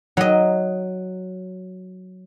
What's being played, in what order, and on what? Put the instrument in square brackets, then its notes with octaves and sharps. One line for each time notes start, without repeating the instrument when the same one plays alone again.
[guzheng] F#3 D#5